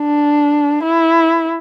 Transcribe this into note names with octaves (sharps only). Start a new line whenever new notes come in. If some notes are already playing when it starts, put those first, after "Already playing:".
Already playing: D4
E4